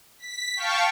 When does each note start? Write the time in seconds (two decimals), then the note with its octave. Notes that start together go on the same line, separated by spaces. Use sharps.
0.18 B6
0.56 F5 G5 A5 C#6